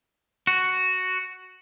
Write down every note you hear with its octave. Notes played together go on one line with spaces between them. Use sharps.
F#4